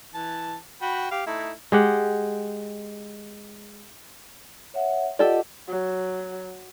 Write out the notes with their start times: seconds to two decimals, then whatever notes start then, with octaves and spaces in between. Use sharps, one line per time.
0.14 E3 A5
0.82 F#4 G5 B5
1.11 G4 F5
1.27 A3 D#4 E4
1.72 G#3 G4 F#5
4.74 C#5 E5 F#5
5.19 F4 G4 A4 D5 D#5 F#5
5.68 F#3